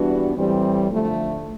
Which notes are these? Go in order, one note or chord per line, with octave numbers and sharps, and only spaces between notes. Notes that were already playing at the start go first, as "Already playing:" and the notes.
Already playing: E3 G3 B3 D4 F#4
A2 E3 G3 C4
D3 F3 A3